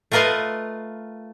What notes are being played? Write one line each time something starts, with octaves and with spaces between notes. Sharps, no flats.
A3 F4 A#4 B4 D#5 F5